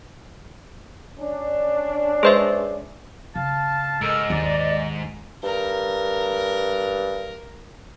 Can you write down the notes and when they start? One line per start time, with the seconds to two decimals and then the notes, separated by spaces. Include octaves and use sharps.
1.19 C#4 D4
2.23 G#3 G#4 B4 C5 E5
3.35 C#3 F5 A5
4.01 G#2 A4 A#4 D#5 E6
4.30 D#2 D5
5.43 G2 A#4